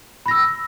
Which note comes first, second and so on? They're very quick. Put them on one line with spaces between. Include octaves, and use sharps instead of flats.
B5 A#6 E6